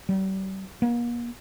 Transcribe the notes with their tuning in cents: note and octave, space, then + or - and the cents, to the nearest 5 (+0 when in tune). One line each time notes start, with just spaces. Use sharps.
G3 -40
A#3 +40